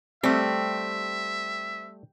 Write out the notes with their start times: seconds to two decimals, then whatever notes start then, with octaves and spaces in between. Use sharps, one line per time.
0.23 G3 A3 C4 E5